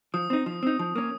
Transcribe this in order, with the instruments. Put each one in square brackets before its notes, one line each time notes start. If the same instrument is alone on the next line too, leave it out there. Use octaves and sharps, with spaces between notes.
[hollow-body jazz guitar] F3 [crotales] D#6
[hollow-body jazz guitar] C4 D#4
F3
C4 D#4
F3
A#3 C#4